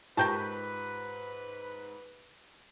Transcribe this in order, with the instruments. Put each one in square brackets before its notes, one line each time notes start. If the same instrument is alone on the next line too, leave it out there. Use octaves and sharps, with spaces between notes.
[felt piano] G#2 [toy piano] F4 G4 [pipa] A#4 G5 A5 [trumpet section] B4